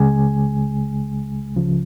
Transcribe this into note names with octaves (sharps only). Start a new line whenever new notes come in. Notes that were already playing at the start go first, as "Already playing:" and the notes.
Already playing: C#2 C#3 G#3 G#5
C#2 C#3 F3